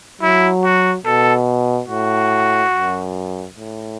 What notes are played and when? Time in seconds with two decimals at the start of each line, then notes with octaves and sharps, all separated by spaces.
0.22 F#3 E4
0.64 F#4
1.05 B2 A4
1.88 A2 F#4
2.72 F#2
3.56 A2